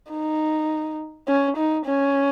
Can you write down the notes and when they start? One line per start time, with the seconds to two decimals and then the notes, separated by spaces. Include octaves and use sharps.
0.12 D#4
1.28 C#4
1.57 D#4
1.86 C#4